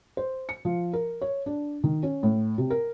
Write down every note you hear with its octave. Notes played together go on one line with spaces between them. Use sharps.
C5
C#7
F3
A#4
C#5
D4
D#3
C#4
A2
C3
A#4